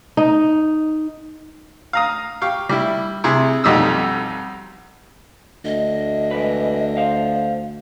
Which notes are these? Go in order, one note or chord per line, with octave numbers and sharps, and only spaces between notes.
D#4
F5 A#5 D#6
G4 F5 C#6
G3 E4
C3 E4 G#4
B1 F2 G3 D#4 D#6 E6
D2 D#5
E3 G#3 B4
C5 F5